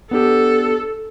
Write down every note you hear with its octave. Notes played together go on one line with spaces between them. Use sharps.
B3 D4 G4 A4